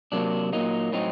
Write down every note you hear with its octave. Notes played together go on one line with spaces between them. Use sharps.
C3 F#3 A#3 D4
A#2 F#3 A#3 D#4
A2 F#3 C4 D#4